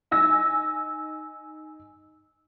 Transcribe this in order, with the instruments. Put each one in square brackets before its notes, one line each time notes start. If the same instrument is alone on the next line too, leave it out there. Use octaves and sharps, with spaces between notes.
[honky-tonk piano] D#4 G#5 E6 A#6